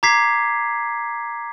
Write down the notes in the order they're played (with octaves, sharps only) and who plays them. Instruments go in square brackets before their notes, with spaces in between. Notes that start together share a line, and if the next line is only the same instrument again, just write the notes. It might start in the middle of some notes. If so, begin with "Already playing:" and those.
[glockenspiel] A#5 D6 G#6 B6 C7